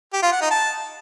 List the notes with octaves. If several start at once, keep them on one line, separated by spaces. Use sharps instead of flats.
G4
F4
F#5
D#4
A5